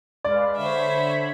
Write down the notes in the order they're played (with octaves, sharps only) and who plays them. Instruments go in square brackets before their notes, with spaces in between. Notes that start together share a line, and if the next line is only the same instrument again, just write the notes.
[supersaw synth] G#3 B4 F5 [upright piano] D5
[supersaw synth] D3 C#5 B5 [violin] C5 E5